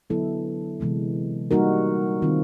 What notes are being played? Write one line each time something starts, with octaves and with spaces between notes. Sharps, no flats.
D3 F#3 B3 E4 A4
C3 E3 G#3 B3
G3 A#3 D#4 F#4 A#4
D#3 G3 C4 F4